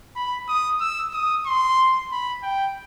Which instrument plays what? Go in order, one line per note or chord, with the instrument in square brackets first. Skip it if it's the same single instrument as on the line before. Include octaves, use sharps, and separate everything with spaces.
[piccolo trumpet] B5
D#6
E6
D#6
C6
B5
G5